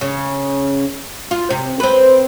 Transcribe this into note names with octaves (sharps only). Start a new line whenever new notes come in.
C#3
F4
C3
C4 B4